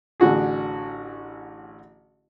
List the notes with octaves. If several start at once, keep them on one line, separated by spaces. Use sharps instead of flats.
A1 D3 F#4 G#4